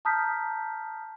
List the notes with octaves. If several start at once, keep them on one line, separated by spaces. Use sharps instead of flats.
A5 A#5 D#6 F6 G6 B6